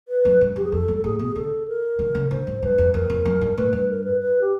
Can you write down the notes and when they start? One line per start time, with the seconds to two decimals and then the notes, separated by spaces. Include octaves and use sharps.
0.08 B4
0.25 F#2
0.41 G2
0.56 F2 G4
0.64 G#4
0.72 F2 A4
0.88 G2
0.97 A4
1.04 A2 G#4
1.19 B2 G#4
1.35 D3 A4
1.68 A#4
1.99 D3
2.15 C#3
2.31 D3 C5
2.47 G#2
2.62 G2 B4
2.78 F2
2.94 F2 A#4
3.04 E2
3.10 F2
3.25 F#2
3.41 G2
3.57 A2 B4
3.73 G2 B4
3.89 A#4
4.04 B4
4.20 B4
4.41 G4